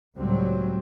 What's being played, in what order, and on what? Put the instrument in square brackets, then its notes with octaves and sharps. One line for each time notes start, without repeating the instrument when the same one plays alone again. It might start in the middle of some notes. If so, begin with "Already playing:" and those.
[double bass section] C#2 A2 F#3 G3 C4